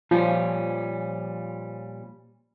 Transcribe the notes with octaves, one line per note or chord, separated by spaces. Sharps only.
A#2 F3 G3 C#4